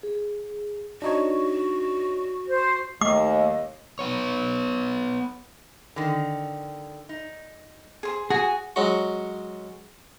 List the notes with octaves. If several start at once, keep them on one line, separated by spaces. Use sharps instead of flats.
G#4
D4 D#4 F#4 C#5
C5
D#2 A3 D#5 D6
B3 C#5
D3 D#3
D#4
G#4 C5
F#4 G#4 G#5
F#3 G#3 C#4 F#4 C#6